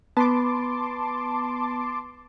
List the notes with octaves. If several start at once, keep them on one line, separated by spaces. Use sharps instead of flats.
B3 A5 C6 D6